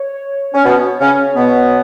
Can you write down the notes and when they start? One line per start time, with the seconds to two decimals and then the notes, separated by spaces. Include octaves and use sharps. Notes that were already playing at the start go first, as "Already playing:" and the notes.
Already playing: C#5
0.54 C#4
0.65 B2 B3 C#5
1.00 C#3 C#4
1.36 B2 B3